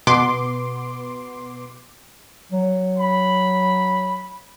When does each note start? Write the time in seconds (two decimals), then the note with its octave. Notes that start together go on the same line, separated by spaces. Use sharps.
0.07 B2 B3 C6 D6
2.52 F#3
2.98 B5